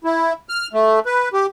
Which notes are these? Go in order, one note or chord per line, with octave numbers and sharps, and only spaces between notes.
E4
F6
A3
B4
G4